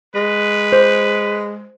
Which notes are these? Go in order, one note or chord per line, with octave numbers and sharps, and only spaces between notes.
G#3 B4
C5